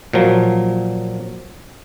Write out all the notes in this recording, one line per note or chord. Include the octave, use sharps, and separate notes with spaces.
A#2 F3 F#3